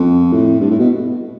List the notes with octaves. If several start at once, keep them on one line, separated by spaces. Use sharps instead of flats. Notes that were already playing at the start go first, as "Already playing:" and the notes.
Already playing: F2
A2
G2
A2
B2